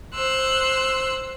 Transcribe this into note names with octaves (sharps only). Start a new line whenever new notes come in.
C5 E6 F#6